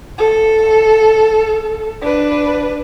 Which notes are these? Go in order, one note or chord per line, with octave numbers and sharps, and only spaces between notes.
A4
D4 B4